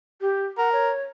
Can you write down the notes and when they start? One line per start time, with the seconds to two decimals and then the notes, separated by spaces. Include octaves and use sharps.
0.21 G4
0.58 A#4 F#5
0.72 C#5